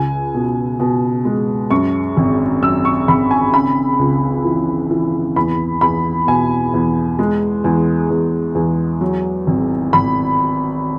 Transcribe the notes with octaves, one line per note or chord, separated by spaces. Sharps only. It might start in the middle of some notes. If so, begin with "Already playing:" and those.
Already playing: C#2 G#5
B2
B2
G#3
F#2 C#6
G#1
F#2 E6
C#6
G#1 B5
G#5
C#3 B5
C#2
E3
E3
E2 B5
E2 B5
B2 G#5
E2
G#3
E2
E2
E2
F#3
G#1
G#1 B5